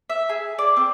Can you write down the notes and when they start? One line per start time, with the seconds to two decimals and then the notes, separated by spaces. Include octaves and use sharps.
0.10 E5
0.29 G#4
0.59 D5
0.76 C4